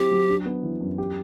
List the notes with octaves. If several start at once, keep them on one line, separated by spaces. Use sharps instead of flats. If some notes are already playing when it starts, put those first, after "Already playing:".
Already playing: F#3 C4 E4 G4
F#3
D4
B3
E3
F#2
G4